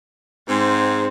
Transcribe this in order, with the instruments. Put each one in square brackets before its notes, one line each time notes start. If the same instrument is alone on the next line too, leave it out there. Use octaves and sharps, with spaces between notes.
[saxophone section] G#2 [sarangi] C4